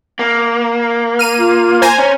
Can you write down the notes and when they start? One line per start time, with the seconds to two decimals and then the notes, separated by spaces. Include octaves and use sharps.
0.19 A#3
1.19 F6 D#7
1.39 F4
1.82 C5 G#5 A#5
1.99 C#4